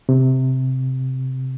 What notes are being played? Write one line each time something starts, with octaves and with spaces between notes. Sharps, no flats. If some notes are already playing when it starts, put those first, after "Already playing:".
C3